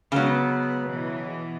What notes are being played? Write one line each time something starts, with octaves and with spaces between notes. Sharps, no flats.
C#3 F#3 G#3 B3
B2 E3